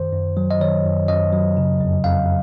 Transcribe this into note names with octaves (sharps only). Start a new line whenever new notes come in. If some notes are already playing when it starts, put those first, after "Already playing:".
Already playing: F#2 D#3 C5
F#2
F#3
D#5
D#3 C#5
F#2
F#2 D#5
F#3
C#3
F2
F2 F5